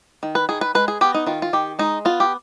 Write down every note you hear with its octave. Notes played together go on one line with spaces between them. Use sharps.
D#3
B4
D#3 G#4
B4
G#3 B4
G#4
B3 G4
D#4
D#3 F4
F4
D#3 G4
G#3 D#4
B3 F4
G4